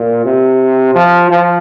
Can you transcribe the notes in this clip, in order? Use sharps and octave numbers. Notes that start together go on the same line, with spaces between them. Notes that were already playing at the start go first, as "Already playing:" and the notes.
Already playing: A#2
C3
F3
F3